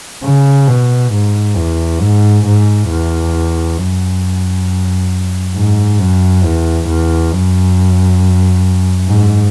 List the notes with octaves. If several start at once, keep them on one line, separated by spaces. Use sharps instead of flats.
C#3
B2
G#2
E2
G#2
G#2
E2
F#2
G#2
F#2
E2
E2
F#2
G#2